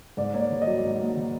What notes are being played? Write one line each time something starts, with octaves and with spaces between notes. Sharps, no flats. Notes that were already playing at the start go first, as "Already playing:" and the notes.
G#2 D5
A#3 C#5
D5
D#3
D#5
F#3
G#2
A#3
D#3